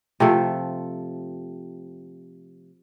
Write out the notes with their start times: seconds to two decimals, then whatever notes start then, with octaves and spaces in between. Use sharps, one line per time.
0.20 C3 F3 A3